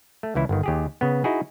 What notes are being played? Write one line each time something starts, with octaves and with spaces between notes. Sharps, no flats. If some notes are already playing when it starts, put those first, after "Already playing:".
A3
C#2 E3 E4
G1 D#3
D#2 G4 G#4
C#3 B3
D#4 E4 F#4 G#4